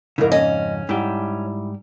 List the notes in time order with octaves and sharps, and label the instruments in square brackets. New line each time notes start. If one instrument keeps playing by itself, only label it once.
[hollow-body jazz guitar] F2 G#2 C#3 [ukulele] E4 A#4
[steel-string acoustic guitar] C#4 [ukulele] D#5
[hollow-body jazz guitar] G#2 G3 G4 [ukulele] E4